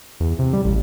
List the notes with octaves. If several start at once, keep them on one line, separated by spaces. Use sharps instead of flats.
E2
C3
G3
A1